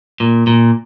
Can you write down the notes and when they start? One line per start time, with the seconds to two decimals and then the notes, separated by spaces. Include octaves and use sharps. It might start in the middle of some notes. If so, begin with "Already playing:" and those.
0.20 A#2
0.47 A#2